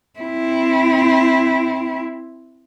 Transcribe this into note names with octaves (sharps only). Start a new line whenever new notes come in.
C4 E4